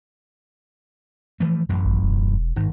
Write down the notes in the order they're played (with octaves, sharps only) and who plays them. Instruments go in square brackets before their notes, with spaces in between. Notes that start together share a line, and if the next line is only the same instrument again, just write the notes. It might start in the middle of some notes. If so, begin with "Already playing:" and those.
[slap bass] E3 F3 A3
A1 F#2
[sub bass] G#1
E1
[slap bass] G#1 [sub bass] G#2